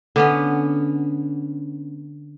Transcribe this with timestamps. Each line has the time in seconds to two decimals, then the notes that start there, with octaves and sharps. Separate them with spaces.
0.16 D3 B3 C#4